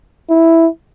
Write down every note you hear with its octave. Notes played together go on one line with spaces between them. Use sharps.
E4